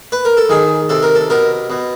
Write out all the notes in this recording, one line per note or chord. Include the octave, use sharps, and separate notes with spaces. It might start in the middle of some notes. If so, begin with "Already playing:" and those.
B4
A#4
A4
D#3 G#4
C3 A4
A#4
A4
B2 A#4
B2